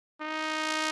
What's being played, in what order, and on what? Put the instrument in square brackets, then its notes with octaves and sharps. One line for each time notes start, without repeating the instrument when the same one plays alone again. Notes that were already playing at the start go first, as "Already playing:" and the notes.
[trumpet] D#4